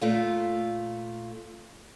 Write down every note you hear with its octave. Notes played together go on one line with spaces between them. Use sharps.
A#2 A3 F4